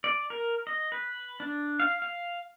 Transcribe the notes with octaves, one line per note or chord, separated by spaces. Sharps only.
D5
A#4
D#5
B4
D4
F5
F5